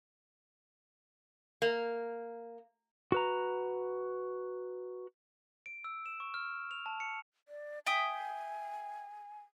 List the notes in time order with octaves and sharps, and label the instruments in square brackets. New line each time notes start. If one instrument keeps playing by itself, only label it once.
[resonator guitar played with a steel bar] A#3
[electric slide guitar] F#4 B4 A#5
[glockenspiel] D7
E6
E7
C#6
F6
F7
A5
C#7
[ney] D5
[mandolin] E5 G5 D#6 [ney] G#5